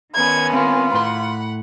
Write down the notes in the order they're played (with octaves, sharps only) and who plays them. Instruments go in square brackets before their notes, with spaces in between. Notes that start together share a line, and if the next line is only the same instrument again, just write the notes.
[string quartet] D#3 B3 C#4 [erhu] G#6
[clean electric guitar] C4 A#4 [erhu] F4
[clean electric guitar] A2 C6 [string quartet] F#5 B5